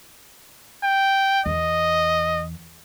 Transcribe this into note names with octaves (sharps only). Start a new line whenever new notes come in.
G5
E2 D#5